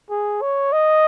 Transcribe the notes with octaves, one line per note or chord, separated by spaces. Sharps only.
G#4
C#5
D#5